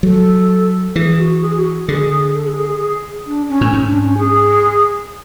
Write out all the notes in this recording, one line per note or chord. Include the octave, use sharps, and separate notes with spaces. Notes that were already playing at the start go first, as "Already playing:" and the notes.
F#3 A4
E3 G#4
F#4
G#4
F#4
D3 G#4
A4
G#4
G#4
G#4
G#4
D4
C#4
A2
G#2
C#4
D4
C#4
G#4